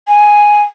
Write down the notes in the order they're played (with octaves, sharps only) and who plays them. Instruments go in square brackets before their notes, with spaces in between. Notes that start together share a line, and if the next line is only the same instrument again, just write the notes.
[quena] G#5